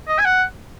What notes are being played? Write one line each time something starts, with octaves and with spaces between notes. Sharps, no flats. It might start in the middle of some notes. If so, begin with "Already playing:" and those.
D#5
G#5
F#5